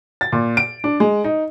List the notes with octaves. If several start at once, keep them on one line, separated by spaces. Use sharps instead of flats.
A6
A#2
D7
D4
G#3
D#4